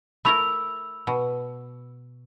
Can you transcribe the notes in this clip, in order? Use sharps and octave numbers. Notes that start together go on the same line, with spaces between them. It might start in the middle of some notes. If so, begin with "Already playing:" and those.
A3 E4 A#4 B5 E6 F7
B2